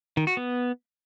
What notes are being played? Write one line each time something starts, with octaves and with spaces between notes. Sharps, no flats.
D#3
F#4
B3